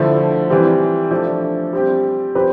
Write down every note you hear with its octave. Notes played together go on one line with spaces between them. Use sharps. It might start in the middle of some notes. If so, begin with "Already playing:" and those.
Already playing: D3 F3 A3 E4
E3 G3 C4
F3 A3 D4
G3 C4 G4
F3 C4 G4 B4